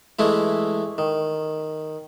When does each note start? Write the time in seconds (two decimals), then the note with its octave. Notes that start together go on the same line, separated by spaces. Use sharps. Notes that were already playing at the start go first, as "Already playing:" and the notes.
0.19 E3 G#3 A3 E4
0.98 D#3